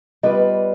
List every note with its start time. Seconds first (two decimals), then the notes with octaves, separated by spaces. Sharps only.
0.23 G3 B3 F4 B4 D5 D#5